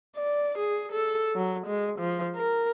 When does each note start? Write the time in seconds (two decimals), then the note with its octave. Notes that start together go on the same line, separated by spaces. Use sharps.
0.17 D5
0.58 G#4
0.92 A4
1.36 F#3
1.67 G#3
1.99 F3
2.36 A#4